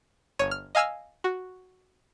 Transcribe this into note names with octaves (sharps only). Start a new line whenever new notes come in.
G1 C#5 D#7
F6
D#5 F5 G#5 E6 F6
F#4